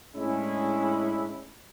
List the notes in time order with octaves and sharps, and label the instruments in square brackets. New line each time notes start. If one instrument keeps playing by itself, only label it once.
[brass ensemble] A2 G#3 C#4 D4 E4